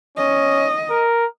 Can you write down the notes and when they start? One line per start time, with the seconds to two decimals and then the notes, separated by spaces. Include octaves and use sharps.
0.18 C#4 D#5
0.90 A#4